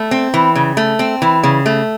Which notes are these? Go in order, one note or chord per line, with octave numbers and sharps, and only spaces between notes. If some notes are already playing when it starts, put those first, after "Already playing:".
Already playing: A3
C4
E3
C#3
A3
C4
E3
C#3
A3